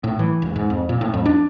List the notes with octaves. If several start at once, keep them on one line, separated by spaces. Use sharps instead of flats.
A2
E3
E1
G#2
F2
A#2
A2
F2
D4